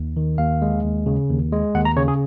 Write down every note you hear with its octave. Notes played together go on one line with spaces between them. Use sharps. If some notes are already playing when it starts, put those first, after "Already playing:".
Already playing: D#2
D#3
D#2 F5
G#3
D#2
C#3
D#2
G#3
D#2 F#5
A#5
C#3 C#5
G#4